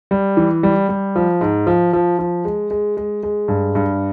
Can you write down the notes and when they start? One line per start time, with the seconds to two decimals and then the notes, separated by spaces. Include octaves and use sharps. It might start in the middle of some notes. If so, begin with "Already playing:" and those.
0.11 G3
0.37 E3
0.63 G3
0.89 G3
1.16 F3
1.41 G#2
1.67 F3
1.93 F3
2.19 F3
2.45 G#3
2.71 G#3
2.97 G#3
3.23 G#3
3.48 G2
3.75 G2